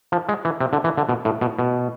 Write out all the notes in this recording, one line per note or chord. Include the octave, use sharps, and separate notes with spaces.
F3
G#3
E3
C3
D3
E3
D3
B2
A2
B2
B2